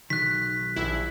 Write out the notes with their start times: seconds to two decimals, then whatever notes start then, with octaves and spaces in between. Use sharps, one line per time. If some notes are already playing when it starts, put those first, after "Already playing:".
0.10 B1 D#3 F#6 B6
0.76 A#1 E4